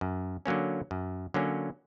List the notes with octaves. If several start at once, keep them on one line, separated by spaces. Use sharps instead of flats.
F#2
D3 F#3 A#3 C#4
F#2
D3 F#3 A#3 C#4